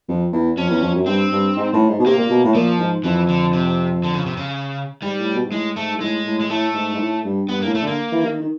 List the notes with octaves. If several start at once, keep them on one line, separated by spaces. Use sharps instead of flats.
F2
E2
F2 C#4
E2
F2
F#2
G2 C4
G2
G#2
A2
G#2
B2
C3 A#3
A#2
B2
A2
A#2 F3
G#2
F2 E3
D3
C3
D3
C#3
C3
C#3
G#2 G3
A2
B2
G#2
A2 G#3
G#2 A3
G#2
A2 G#3
A2
G#3
A2 A3
G#2
G#2
A2
G2
G2 B3
A2 A#3
A3
D3
A#3
E3
D#3
D#3